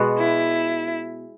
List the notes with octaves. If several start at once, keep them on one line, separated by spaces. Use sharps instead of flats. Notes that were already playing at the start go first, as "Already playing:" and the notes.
Already playing: B2 G#3 B3 F#4
E4